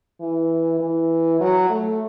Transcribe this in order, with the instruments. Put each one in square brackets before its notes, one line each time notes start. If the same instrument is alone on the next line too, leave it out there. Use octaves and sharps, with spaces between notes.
[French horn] E3
E3
F#3
A3